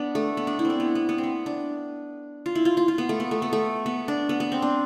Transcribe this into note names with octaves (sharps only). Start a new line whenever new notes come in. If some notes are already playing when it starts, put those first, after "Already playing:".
Already playing: B3 D4
A3
B3
D4
E4
C4
D4
B3
B3
B3
C4
B3
D4
F4
E4
F4
F4
F4
B3
A3
B3
A3
B3
A3
B3
D4
B3
B3
C4
D4